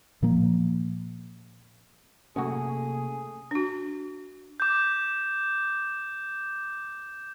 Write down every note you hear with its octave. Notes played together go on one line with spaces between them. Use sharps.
A#2 F3 A#3
F#2 C3 A3 A#3 C#4 F#4 G#4
D4 F#4
D6 G6